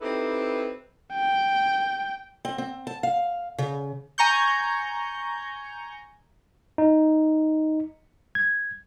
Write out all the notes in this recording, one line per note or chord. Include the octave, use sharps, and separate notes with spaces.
C4 D#4 E4 G4 A4 B4
G5
C4
C4
A5
F5
C#3
G#5 A#5 C#6 G6
D#4
G#6